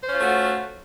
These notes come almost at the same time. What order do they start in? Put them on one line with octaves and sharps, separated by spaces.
C5 C#4 F4 A3 F#4